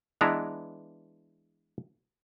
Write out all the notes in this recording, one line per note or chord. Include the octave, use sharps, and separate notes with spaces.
E3 G#3 B3 D4 E4 A#5